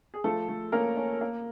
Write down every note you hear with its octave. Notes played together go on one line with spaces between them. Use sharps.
G#4
F3 A3 A4
A3
A#3 C#4 A#4
C#4
A#3